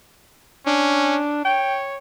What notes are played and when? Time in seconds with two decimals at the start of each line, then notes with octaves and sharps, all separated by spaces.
0.66 C#4 D4
1.45 C#5 G5